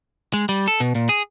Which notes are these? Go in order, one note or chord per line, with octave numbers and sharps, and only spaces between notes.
G#3
G3
A4
B2
A#2
G#4